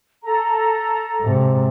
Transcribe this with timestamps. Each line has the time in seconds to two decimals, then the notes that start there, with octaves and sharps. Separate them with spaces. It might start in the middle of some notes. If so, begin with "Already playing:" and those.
0.23 A4 A#5
1.22 G#2 C3